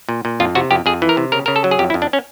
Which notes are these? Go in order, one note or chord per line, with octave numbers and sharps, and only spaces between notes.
A#2
A#2
F2 F4
C3 F#4
F2 G4
F2 G#4
E3
A#4
C3
C#3 A#4
C#3 A#4
A4
F#3
G#4
F2 G4
E4
F2
D4
C#4